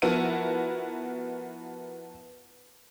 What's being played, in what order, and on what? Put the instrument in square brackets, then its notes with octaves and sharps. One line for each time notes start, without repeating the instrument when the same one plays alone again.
[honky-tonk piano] F3 B3 E4 F#4 A#4 D#7